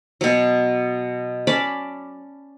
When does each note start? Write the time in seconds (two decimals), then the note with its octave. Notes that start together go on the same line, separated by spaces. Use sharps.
0.21 B2 F#3
1.47 C#4 D5 A5 B5